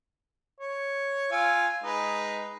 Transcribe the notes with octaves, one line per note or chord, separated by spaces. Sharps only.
C#5
F4 G#5 E6
G#3 D#4 B4